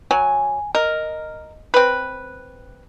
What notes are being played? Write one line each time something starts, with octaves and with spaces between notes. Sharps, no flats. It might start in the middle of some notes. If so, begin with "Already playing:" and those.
F#3 G#5
A#4 D#5
C4 B4